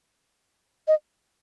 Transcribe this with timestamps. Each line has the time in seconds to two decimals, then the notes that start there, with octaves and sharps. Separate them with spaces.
0.88 D#5